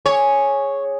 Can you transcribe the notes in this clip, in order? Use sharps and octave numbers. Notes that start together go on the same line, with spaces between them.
G#4 C#5 D6